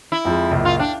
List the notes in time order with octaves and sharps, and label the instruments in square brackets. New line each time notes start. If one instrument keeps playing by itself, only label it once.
[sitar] E4
[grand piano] F2 F3 G#3
C#2 F#2 A#2
[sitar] F4
[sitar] D4 [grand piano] G5